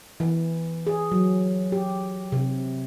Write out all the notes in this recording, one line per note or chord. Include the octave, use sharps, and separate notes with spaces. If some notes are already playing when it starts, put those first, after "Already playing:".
E3
G#4
F#3
G4
C3